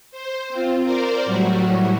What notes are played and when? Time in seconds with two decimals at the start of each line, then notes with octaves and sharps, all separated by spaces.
0.11 C5
0.49 C4 F4
0.83 A#4 C5 D5
1.26 A2 F#3 G3 F#4